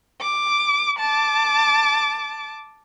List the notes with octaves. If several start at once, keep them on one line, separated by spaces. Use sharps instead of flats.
D6
A5 D6